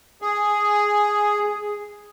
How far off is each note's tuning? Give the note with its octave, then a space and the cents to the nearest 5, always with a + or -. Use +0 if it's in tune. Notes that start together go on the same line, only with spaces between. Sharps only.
G#4 +0